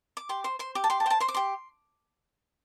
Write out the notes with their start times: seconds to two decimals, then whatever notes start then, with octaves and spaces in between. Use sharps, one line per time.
0.17 D6
0.29 G4 C6
0.44 C5 C6
0.59 C5 C6
0.75 G4 D6
0.84 A5
0.90 G4 C6
1.00 A5
1.06 C5 G5
1.10 A5
1.20 C5 C6
1.28 D6
1.34 G4 C6